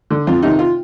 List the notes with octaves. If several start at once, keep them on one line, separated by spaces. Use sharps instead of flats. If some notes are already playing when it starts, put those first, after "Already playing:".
D3
F2 F4
C3 D#3 D#4
F4